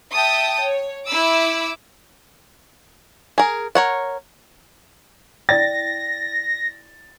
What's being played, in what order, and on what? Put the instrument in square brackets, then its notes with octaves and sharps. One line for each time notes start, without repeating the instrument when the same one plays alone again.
[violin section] E5 G5 A5 D#6
C#5
E4 B5 D6 E6
[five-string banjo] G#4 A#4
A#4 C#5 F#5
[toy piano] E4 D5 G5 [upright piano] A6 [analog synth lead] A#6